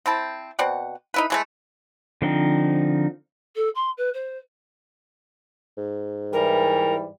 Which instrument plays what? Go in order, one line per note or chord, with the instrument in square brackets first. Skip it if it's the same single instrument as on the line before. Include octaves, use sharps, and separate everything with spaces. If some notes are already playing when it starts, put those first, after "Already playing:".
[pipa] C4 E4 A5
B2 C4 D5 F#5
D#4 E4 B4
E3 G#3 A3
[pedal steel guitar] D3 F3 C4 D#4
[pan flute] A4
C6
B4
C5
[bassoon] G#2
[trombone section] E3 G3 [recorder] A#4